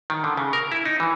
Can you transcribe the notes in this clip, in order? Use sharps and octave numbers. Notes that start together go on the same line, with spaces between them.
D#3
D3
C#3
A#4
E4
D#4
E3